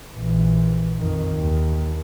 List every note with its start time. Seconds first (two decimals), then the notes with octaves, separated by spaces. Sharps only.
0.15 A#1 E3
0.97 F2 D#3
1.39 D#2